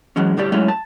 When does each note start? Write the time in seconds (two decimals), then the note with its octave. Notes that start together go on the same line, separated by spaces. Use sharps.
0.16 E3 F#3 G#3 C#4
0.37 D2 A2 G3 G4 D5
0.52 F#3 G#3 A3 C#4 E4 A4
0.68 A5